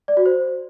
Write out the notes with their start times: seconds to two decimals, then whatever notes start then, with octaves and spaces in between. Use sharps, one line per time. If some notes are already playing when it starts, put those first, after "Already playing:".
0.08 D5
0.17 F#4
0.26 C5